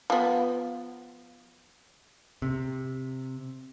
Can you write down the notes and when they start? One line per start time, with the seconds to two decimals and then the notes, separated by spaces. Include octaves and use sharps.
0.10 F3 B3
2.42 C3